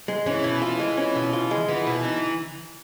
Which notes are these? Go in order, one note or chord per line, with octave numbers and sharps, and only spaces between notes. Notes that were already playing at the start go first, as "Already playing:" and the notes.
G#3
E3 C#4
B2
F4
G#3
C#4
B2
F4
G#3
E3 B3
B2
D#4